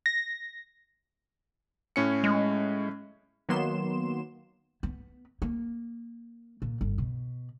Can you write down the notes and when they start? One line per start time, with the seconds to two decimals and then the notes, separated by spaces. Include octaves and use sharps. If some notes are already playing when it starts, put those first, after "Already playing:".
0.06 A#6
1.96 A2 C#4 C#7
2.24 G#3
3.49 D#3 F#3 A#3 B3 C6 E7
4.83 B3
5.42 A#3
6.62 A#2
6.81 G1
6.98 B2